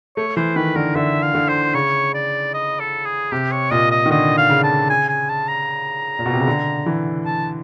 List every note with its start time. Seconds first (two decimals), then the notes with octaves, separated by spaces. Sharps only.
0.17 A3 C#5
0.37 E3 C5
0.56 D#3 B4
0.76 D3 A#4
0.95 D3 E5
1.22 F5
1.35 D3
1.49 C5
1.74 C#3 C#5
2.14 D5
2.54 D#5
2.80 A4
3.05 G#4
3.32 C3 G4
3.52 C#5
3.71 A#2 D#5
3.91 D#5
4.06 D#3
4.11 D3 D#5
4.37 F5
4.50 C#3
4.64 A5
4.90 G#5
5.09 G#5
5.29 A5
5.48 A#5
6.19 A#2
6.26 B2
6.33 C3
6.40 C#3
6.47 D3
6.86 E3
7.26 A5